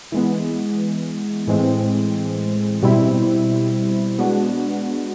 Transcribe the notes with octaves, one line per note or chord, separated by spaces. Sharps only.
E3 G#3 B3
A2 E3 G#3 C4
B2 G3 C4 E4
G#3 B3 D4 F#4